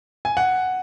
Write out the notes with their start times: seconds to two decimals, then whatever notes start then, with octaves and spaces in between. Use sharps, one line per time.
0.25 G#5
0.37 F#5